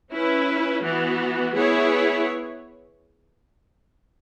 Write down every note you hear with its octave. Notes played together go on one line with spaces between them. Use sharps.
C#4 E4 B4
E3 B3 F#4
B3 E4 G#4 C#5